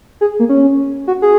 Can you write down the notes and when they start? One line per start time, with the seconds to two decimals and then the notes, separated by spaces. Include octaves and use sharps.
0.21 G#4
0.39 A#3
0.49 C#4
1.07 F#4
1.22 G#4